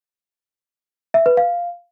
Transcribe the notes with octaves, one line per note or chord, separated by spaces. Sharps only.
E5
B4
F5